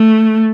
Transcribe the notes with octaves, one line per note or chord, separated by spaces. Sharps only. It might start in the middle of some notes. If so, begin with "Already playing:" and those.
Already playing: A3